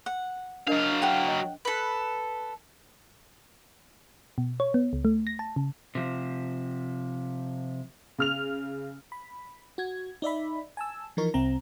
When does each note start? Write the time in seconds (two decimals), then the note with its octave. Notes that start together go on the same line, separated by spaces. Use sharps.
0.06 F#5
0.67 F#3 D4 A#4 D#5 F5
1.02 F#5 G5
1.28 D#5
1.65 A4 B4
4.38 B2
4.60 C#5
4.74 B3
4.93 C#2
5.05 A3
5.27 A#6
5.39 A5
5.56 C#3
5.95 C3 F3
8.18 C#3 F6 F7
9.12 B5
9.78 F#4 G#6
10.22 D#4 D5 E5 B5
10.77 G#5 A5 E6
11.17 E3 F3 D#4 A#4 C#6
11.34 C2 C4 A#5